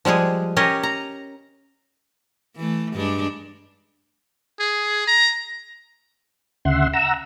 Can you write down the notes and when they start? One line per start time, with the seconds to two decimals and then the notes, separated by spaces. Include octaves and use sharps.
0.05 F3 G3 G#3 G#4
0.56 C#4 G4 A#4 C#5 D#5
0.83 A#5
2.56 E3 A3
2.94 G2 G#3 D4
4.60 G#4
5.07 A#5
6.65 D2 C#3 E5 F#5 C6
6.93 F#5 A#5 E6